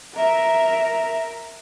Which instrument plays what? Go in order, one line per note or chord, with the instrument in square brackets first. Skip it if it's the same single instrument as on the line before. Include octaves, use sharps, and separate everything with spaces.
[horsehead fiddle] A#4 E5